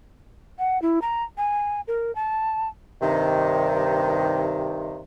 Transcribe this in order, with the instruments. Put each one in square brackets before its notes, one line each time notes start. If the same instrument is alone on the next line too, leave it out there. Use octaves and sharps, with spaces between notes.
[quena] F#5
E4
A#5
G#5
A#4
A5
[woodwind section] G2 C3 D#3